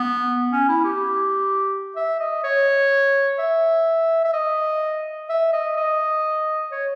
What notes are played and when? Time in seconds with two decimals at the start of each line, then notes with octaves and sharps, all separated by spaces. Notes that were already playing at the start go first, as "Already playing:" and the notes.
Already playing: B3
0.52 C#4
0.69 E4
0.85 G4
1.96 E5
2.20 D#5
2.44 C#5
3.39 E5
4.25 E5
4.34 D#5
5.30 E5
5.53 D#5
5.77 D#5
6.72 C#5